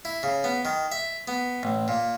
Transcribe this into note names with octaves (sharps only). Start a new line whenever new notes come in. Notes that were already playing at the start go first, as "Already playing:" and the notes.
E4
C#3
B3
D#3
E5
B3
A1
A#2